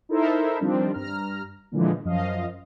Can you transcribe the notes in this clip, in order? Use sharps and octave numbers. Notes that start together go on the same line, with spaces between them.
D#4 E4 A4 A#4 C5 E5
D#3 F3 G3 C4 D4
G2 A#5 F6
A#2 D3 E3 F3 G#3
F#2 F3 D#5 F5